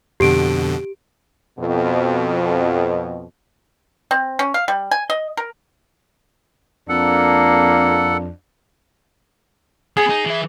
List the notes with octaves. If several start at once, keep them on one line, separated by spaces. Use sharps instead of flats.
F2 B2 D3 G4 D7
F2 B2
C4
C#4
F5
G3
G#5
D#5
A#4
F2 A#3 D4 A4 F#5
B3 G#4
D#4
E3 E5